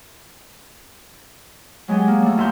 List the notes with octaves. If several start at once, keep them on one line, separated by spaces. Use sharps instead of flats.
F#3 G#3 B3 G4 G#4
A#3
G3 A3
E2 A#3 E5 A#5 C6 G6